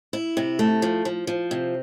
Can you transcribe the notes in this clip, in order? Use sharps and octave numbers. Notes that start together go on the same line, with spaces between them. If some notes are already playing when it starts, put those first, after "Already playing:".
E4
C3
A3
F3
F3
F3
C3